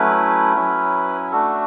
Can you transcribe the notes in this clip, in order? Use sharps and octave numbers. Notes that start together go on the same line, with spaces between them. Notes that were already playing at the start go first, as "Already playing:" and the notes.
Already playing: F#3 A3 C#4 E4 B4
F#3 C#4 E4
A3 D4 F#4 A4